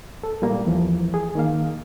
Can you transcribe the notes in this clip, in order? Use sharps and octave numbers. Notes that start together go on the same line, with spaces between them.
A4
A#2 G3 A#3
E2 E3 F3
G#4
D#3 A#3 F5